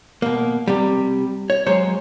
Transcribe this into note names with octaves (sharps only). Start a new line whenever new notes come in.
B2 A#3
C3 G3
C#5
F#3 G#3 C5 C#5